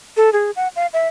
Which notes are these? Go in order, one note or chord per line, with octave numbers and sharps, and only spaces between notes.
A4
G#4
F#5
F5
E5